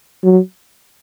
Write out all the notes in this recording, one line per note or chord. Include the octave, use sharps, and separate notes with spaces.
F#3